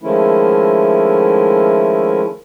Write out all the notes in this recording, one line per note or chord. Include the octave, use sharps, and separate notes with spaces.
D#3 F3 G#3 A3 C#4 E4